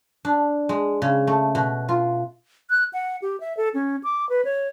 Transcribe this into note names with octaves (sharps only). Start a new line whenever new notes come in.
D4
G#3
C#3
A3
B2
F4
F#6
F#5
G4
E5
A4
C#4
D6
B4
C#5